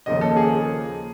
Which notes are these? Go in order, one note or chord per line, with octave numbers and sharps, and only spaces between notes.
D#2 C#3 F3 A#3 D#5
A4
G#4